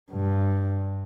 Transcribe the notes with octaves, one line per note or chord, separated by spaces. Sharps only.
G2